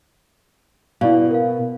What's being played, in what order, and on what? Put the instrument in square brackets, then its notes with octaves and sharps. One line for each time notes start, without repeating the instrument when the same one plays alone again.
[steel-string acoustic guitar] B2 [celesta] E4 D5 F5
[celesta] A#4 F5